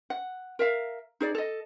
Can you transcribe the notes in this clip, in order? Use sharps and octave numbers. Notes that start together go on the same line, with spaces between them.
F#5
A#4 E5 F5
D#4 G#4 D5
A4 D#5